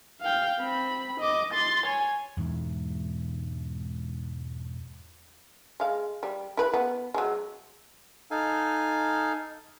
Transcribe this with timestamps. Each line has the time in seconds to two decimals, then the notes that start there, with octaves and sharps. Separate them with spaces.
0.22 F5 G5
0.60 C4 B5
1.20 D#5 D6
1.53 C6 A6
1.86 C#5 G#5
2.37 E1 E2 G#2
5.80 G#3 F5
6.23 G3
6.57 E4 B4
6.73 B3
7.14 F#3 G#3
8.31 D#4 A4 F5 G#5